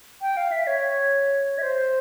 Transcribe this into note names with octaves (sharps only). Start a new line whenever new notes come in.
G5
F5
E5
C#5
E5
C5